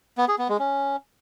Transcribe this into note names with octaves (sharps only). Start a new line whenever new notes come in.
B3
G#4
B3
G#3
C#4